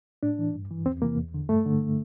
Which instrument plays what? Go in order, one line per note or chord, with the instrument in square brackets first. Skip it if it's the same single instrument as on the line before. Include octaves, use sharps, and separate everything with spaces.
[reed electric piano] A2 D4
E3
G2
E3
E2 C4
C3 E3 A#3
E2
D3
G2 A3
D3